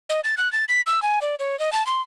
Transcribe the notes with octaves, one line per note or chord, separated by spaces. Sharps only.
D#5
A6
F#6
A6
B6
E6
G#5
D5
C#5
D#5
A5
C6